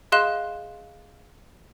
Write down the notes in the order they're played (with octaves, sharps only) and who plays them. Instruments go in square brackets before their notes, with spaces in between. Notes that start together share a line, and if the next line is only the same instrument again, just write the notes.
[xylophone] G#4 D#5 F5 C6 F#6 E7